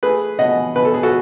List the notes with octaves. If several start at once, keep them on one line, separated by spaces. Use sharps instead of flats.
A3 G#4 B4
B2 D#5 F#5
B2 B4
A4
G#4
F#4 A4